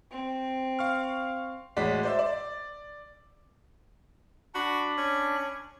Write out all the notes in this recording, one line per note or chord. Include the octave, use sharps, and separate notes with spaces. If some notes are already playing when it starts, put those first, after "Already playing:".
C4
F5 C#6 F6
A1 G#3 F#4 D5 B6
C5 D5 E5
D5
D4 F#4 B5
C#4